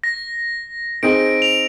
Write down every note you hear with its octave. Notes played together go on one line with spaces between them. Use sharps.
A#6
C4 D#4 G#4 D7
F7